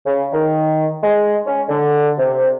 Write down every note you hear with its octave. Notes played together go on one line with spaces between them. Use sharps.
C#3
D#3
G#3
C#4
D3
C3